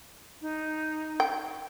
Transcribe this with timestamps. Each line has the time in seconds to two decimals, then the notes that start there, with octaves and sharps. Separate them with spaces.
0.41 D#4
1.20 G5